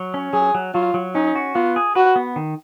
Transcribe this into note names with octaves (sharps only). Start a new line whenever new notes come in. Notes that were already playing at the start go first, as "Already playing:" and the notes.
Already playing: F#3
C#4
F#3 G#4
F#3
F#3 F4
F#3
C#4 D#4
F#4
B3 F4
G#4
F#4 B4
B3
D#3